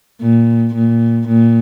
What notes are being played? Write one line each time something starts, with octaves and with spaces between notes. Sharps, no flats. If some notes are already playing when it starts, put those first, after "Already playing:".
A#2
A#2
A#2